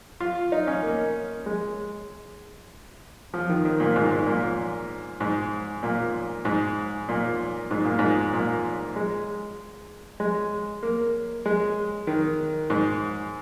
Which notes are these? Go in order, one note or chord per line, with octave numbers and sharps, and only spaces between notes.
F4
D#4
C#4
A#3
G#3
F3
D#3
D#3
A#2
G#2
G#2
A#2
G#2
A#2
G#2
A#2
G#2
A#2
G#2
A#2
G#3
G#3
A#3
G#3
D#3
G#2